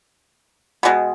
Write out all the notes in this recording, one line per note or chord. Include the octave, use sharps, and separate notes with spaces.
B2 G#3 B3